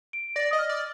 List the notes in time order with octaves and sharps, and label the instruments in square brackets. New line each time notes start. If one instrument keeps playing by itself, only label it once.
[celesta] D7
[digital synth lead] D5 [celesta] A#6
[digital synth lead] D#5 [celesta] D#6
[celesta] F6
[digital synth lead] D5